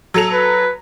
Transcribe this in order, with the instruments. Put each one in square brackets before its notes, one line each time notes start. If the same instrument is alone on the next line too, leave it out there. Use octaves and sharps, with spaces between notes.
[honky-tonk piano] F#3 A4 F7
[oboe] B4